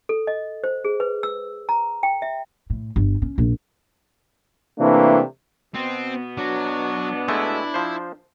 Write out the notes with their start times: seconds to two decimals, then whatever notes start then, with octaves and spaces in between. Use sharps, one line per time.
0.09 A4
0.27 D#5
0.64 C5
0.85 G#4
1.00 B4
1.23 E6
1.69 A#5
2.03 G5
2.22 E5
2.70 A2
2.96 G1
3.22 C#4
3.38 A#1
4.79 C3 E3 A3 A#3 D4
5.75 B2 B3 C4
6.37 F#3 D4
7.28 G#3 A3 E4
7.74 F3 C5